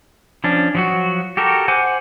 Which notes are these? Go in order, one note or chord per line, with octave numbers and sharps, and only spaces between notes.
F3 C#4 D4
F3 F#3 F#4
F#4 G4 A4 A#4
C5 F#5 G#5 D6